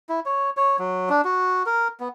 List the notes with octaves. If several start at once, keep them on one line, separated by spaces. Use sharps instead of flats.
E4
C#5
C#5
F#3
D4
F#4
A#4
B3